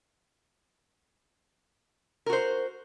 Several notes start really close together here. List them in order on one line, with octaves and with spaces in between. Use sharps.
A#4 F#4 C5